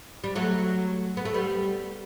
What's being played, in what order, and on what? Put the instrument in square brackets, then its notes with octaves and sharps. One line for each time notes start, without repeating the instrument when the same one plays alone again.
[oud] G3
F#3 A3
B3
A3
G3 B3